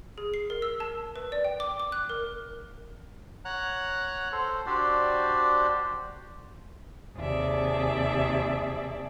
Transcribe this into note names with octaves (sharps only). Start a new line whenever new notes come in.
G#4
C7
A#4
E6
A5
B4
D5
G5
D6
D6
F#6
A#4
C#5 F#5 A#5 F#6
A4 C5
D4 F#4 G4 C5 D5
D#2 C3 G#4 D5 E5 A5